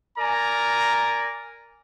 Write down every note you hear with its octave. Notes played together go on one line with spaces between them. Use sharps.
A#4 D5 G#5 A#5